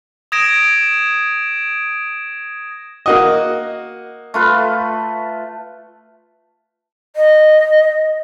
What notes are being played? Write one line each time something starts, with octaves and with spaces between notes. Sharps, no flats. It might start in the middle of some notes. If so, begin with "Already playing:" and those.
D#6 G#6 A#6 D7 E7
A#3 F#4 D#5
A3 F4 B4
D#5